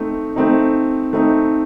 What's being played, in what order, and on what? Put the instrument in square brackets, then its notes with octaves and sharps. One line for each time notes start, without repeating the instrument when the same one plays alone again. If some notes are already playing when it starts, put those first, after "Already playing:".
Already playing: [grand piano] A3 C4 D#4
A3 C4 D#4
A3 C4 D#4